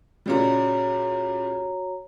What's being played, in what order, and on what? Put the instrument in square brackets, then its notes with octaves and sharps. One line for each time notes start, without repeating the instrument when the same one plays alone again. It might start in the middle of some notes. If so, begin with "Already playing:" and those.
[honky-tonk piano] A#2 C#3 G3 [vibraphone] F#4 C#5 A#5